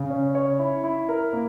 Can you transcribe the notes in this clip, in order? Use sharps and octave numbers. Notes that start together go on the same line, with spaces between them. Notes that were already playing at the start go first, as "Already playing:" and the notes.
Already playing: C#3
C#4
C#5
E4
E4
A#4
A#3